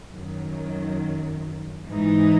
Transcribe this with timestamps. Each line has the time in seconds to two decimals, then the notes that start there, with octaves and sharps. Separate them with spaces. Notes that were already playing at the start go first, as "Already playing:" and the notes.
0.13 F#2 D#3 F#3
1.88 G#2 E3 G#3 D#4